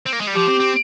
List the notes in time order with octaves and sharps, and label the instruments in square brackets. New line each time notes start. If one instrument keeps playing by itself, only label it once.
[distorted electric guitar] C4
A#3
G#3
G3
[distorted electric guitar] F3 [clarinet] G4
[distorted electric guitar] C4
C4